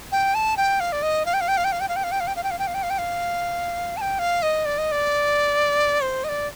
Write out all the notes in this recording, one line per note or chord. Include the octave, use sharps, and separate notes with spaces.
G5
A5
G5
F5
D5
D#5
F5
G5
F5
G5
F5
G5
F5
G5
F5
G5
F5
G5
F5
G5
F5
G5
F5
G5
F5
G5
F5
G5
F5
A5
G5
F5
D#5
D5
D#5
D5
C5
D#5
D5